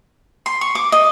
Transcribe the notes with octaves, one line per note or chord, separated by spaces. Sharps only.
C6
C#6
D6
D#5